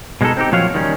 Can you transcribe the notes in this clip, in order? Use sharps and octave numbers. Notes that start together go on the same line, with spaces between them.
B2 G#3 A#3 D#4 A4
C4 D#4 G4
A#2 F3 F#3 F#4 C#5 F5
D#3 G3 A#3 C#4